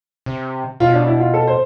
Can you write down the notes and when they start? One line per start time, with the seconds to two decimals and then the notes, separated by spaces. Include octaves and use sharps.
0.26 C3
0.80 B2 F4
0.93 D4
1.07 E4
1.20 F4
1.34 A4
1.47 C5